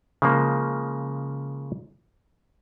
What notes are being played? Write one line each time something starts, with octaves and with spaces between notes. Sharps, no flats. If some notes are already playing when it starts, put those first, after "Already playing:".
C#3 F3 G#3 A#3